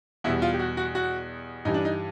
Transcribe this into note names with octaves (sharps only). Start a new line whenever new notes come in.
E2 B2 G3 E4
F4
G4
F#4
F#4
F#4
G2 E3 G3 D#4
D4
D#4